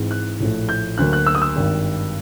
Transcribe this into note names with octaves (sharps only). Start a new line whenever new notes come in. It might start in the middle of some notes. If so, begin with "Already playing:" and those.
Already playing: G#2 E3 G#3 C4
F#6
A#1 A2 F3 A3
G6
D2 D3 F#3 A#3 F#6
F#6
E6
D#6
E6
G#1 G2 D#3